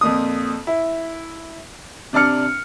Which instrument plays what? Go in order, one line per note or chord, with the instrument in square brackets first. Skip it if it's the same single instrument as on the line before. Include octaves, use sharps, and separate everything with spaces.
[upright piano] F2 A#2 D#6
E4
C3 D4 D5 F6 C#7